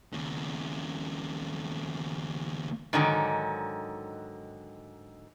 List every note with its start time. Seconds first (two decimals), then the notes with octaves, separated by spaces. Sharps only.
0.13 D#2 C#3
2.93 G#2 D3 D#3 F#3